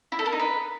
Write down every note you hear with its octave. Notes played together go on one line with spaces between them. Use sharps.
E4
A4
A#4
D#4
B4